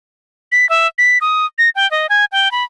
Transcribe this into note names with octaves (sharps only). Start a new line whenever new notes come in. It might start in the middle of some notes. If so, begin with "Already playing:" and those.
B6
E5
B6
D#6
A#6
G5
D#5
G#5
G5
B5